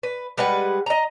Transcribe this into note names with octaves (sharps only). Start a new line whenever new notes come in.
B4
G3 G#3 B4 F#5
D#5 A#5